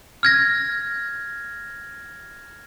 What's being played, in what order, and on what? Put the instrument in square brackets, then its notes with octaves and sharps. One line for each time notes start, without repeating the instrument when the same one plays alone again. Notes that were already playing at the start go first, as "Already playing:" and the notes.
[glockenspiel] F6 G#6 A#6